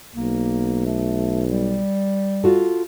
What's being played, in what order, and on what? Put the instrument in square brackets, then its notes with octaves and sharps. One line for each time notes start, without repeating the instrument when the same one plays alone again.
[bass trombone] B1 [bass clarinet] A#3
[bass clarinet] A3
G3
[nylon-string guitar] F4 F#4 A4